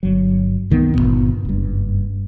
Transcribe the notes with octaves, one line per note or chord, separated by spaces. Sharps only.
G1 F#3
C2 D#3 G#3 B3
G1 F#2 A#2 B3
F#1 G2